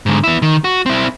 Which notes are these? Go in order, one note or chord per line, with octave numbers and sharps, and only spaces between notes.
G#2 D3
B3 E4
D#3
F#4
C4 E4